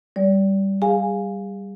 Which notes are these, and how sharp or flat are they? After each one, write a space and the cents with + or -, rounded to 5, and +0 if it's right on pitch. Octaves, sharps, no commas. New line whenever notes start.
G3 +0 D5 -30
G#4 -30 F5 +5 G#5 +0